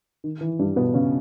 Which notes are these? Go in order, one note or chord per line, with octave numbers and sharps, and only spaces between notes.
D#3
E3
G2 G3
B2 B3
C#3 C#4